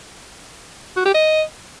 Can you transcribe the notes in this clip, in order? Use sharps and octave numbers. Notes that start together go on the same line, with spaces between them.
F#4
G4
D#5